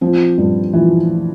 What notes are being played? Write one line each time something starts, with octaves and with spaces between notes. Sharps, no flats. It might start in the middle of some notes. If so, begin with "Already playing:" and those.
F3 C4
G2
E3 F3